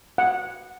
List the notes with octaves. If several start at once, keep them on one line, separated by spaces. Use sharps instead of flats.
F#5